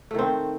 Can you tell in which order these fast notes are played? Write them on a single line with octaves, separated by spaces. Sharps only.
A3 D#3 C4